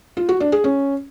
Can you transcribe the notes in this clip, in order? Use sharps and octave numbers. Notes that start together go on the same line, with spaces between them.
F4
F#4
D4
G#4
C#4